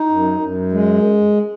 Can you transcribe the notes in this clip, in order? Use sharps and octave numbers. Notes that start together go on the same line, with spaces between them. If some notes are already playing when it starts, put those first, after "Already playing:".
Already playing: D#4
F#2
F#2
G#3